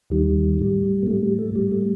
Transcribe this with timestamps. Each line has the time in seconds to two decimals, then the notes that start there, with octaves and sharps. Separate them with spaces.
0.10 D#2 D#3 G3
0.59 A2 G3
1.03 A#3
1.07 A2 G3 A3
1.23 G3
1.39 A3
1.55 A2 G3
1.71 A3